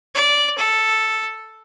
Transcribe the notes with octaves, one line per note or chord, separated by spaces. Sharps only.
D5
A4